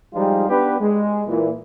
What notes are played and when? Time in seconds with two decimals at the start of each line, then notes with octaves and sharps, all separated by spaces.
0.14 F3 G3 G#3 D#4 F4
0.49 B3 D4 G4 B4
0.80 G#3
1.28 A#2 E3